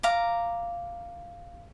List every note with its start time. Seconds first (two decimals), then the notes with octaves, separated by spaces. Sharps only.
0.03 F5 A#5 D6